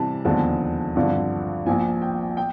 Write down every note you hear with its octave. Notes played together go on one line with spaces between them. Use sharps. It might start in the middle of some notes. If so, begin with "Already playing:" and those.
Already playing: C3 E3 G3 A5
E1 D#2 D3 F3 G#3 A5
G#1 G2 D3 F3
A#1 A#2 F3 G#5
G5
G5